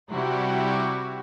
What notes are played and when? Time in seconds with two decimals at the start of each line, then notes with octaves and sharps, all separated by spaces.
0.12 C3 G3 E4 F#4 G4